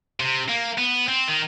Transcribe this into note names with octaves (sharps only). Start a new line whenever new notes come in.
C3
A#3
B3
C4
D#3